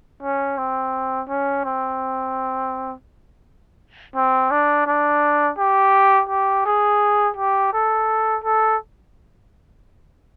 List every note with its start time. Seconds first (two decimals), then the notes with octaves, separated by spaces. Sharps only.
0.23 C#4
0.58 C4
1.29 C#4
1.65 C4
4.16 C4
4.51 D4
4.87 D4
5.59 G4
6.29 G4
6.66 G#4
7.37 G4
7.73 A4
8.44 A4